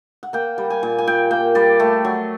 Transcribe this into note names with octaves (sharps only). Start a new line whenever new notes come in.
F#5
A#3 G5
G3
G#5
A#2
G#5
A#2 G5
A#3 G5
G3 D5
A3
F#3